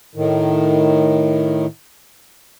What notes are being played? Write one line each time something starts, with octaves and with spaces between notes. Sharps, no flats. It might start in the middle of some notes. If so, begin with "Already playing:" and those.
A2 D#3